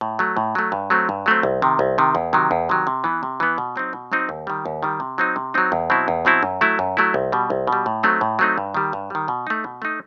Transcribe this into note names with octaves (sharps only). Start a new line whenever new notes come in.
A2
F#3 A3
A2
F#3 A3
G2
F#3 A3 C4
G2
F#3 A3 C4
C2
C3 D#3
C2
C3 D#3
E2
C3 D#3 F#3
E2
C3 D#3 F#3
C3
E3 B3
C3
E3 B3
B2
F#3 C4 D#4
B2
F#3 C4 D#4
D#2
D#3 G3
D#2
D#3 G3
C3
F#3 C4 D#4
C3
F#3 C4 D#4
E2
B2 F#3 C4 E4
E2
B2 F#3 C4 E4
F#2
F#3 A3 E4
F#2
F#3 A3 E4
C2
B2 G3
C2
B2
G3
A2
F#3 A3 C4 D#4
A2
F#3 A3 C4 D#4
G2
D#3 G3
G2
D#3 G3
B2
A3 D#4
B2
A3 D#4